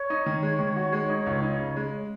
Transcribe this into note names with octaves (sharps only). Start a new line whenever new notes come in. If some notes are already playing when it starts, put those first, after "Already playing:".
Already playing: C#5
D#4
D#3
G#3
D#3
F#4
G#3
D#4
C#2
D#4
C#3
G#3